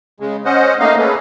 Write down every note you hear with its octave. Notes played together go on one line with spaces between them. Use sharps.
C#3 G#3
C#4 C5 D#5 F#5
A3 A#3 D#4 D#5 F5
C#4 G#4 A4 B4